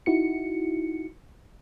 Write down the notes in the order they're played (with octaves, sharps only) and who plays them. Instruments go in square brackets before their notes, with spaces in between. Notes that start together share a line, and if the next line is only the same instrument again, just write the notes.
[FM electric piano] D#4 E4 F#4 C#7